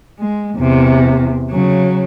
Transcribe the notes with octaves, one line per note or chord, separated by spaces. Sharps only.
G#3
E2 C3
C#3 F#3